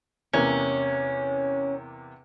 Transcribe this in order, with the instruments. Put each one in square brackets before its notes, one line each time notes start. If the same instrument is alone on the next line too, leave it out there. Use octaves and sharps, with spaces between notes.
[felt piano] E2 C3 A#3 [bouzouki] C#4